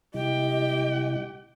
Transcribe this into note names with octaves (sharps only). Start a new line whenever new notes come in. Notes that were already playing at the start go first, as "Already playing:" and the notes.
C3 G3 E4 G4 D#5 G5